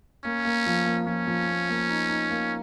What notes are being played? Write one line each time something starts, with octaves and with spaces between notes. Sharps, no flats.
A#3 C#4
A#3
F3
A#3
F3 C#4
F3
A#3
A#3
D#4
D#4
A#3